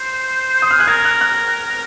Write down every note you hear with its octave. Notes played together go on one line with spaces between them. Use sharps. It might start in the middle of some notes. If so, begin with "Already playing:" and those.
Already playing: C5
D#6
F6
G#4 F#6
A#4 G#6
F#6
F#6